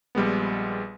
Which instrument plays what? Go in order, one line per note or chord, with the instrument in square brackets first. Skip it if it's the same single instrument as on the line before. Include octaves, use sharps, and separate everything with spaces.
[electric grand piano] A#1 G3 G#3 B3